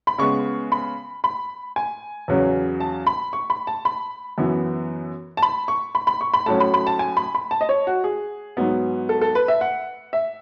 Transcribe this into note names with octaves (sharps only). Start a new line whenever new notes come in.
B5
C#3 G#3 B3 C#6
B5
B5
G#5
E2 C#3 F#3 C#4
A5
B5
C#6
B5
A5
B5
F#2 E3 B3
A5
B5
C#6
B5
B5
C#6
B5
A2 F#3 C#4 A5
B5
B5
A5
G#5
B5
B5
A5
D#5
C#5
F#4
G#4
G#2 F#3 B3
A4
A4
B4
E5
F#5
E5